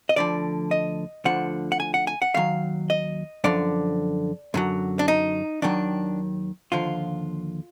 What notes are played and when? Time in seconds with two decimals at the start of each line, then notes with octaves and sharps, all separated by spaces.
0.09 D#5
0.16 D2 D3 F3 D5
0.71 D#5
1.25 D2 D3 F3 F#5
1.72 F#5
1.80 G#5
1.94 F#5
2.07 G#5
2.22 F#5
2.34 D#2 D#3 F#3 F5
2.90 D#5
3.44 F#2 D3 F3 D5
4.54 F#2 D3 F#3
4.99 D4
5.08 D#4
5.62 D#2 D#3 F#3 D4
6.72 D#2 D3 F3 F4